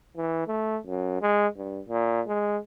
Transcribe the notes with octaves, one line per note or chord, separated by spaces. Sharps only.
E3
A3
F#2
G#3
G2
A#2
G#3